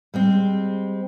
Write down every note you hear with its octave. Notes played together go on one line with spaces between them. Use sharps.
G3 G#3 C4